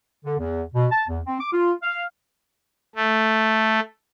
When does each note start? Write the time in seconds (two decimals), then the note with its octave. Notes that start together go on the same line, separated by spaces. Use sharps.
0.25 D3
0.39 E2
0.74 B2
0.91 A5
1.08 E2
1.26 C4
1.40 D6
1.53 F4
1.83 F5
2.96 A3